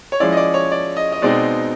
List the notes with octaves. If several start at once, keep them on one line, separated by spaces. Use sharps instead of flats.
C#5
F3 G#3 C#4 E4 D5
D#5
D5
C#5
D5
D#5
D#5
B2 G#3 C4 D#4 D5